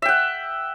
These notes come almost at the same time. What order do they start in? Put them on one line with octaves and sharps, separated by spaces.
E5 G5 F#5